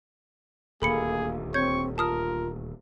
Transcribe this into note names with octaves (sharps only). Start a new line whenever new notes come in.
D#1 D2 A#3 G#4 A4 B5 C#7
C4 C#5 C#6 G6 G#6
F4 A#4 A5 D#6 F6